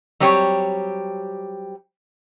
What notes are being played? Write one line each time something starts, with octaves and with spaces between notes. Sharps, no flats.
F#3 G3 C4 G4 C#5